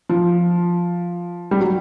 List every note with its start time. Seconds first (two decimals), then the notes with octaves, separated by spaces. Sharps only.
0.09 F3
1.51 G3
1.61 F#3